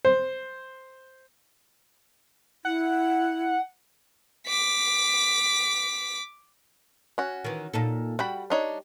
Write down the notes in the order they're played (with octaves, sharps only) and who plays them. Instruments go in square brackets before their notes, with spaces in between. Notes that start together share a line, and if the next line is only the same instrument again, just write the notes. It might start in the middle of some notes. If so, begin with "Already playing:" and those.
[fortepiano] C5
[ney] E4 [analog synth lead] F#5
[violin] D6 B6
[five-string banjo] C#4 F#4
[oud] D#3 E3
A#2 D#4 A4
[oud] G3 [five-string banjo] F#4 G5 B5
[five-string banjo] D4 D#4 C#5